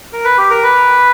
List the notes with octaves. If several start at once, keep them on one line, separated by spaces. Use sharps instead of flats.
A#4
B4
G4
A#4
B4